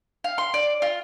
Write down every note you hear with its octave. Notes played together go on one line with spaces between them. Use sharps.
F5
C6
D5
F4